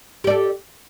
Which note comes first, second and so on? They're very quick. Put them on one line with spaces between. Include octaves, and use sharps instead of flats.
G4 D5 A4